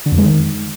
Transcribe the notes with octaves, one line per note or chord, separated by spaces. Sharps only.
D3
F2
G#3
D#3